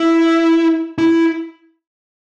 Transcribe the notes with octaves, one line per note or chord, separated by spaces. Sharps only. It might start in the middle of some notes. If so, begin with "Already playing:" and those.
Already playing: E4
E4